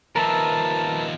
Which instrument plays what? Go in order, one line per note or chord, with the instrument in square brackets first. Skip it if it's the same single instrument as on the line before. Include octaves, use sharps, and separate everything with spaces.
[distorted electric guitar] D#2 F3 [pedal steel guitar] A#4 B4 E5 [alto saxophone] A5